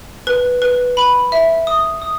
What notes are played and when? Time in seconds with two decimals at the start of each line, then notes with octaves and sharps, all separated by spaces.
0.27 B4
0.62 B4
0.97 B5
1.32 E5
1.67 D#6
2.02 D#6